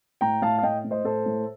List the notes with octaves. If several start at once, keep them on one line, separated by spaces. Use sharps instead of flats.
A2 G5 A#5
A2 F5 A5
F5
A2 D#5 G5
A2
C5 D#5
A2 A4 C5
A2